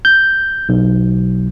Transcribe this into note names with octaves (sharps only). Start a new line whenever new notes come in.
G6
B1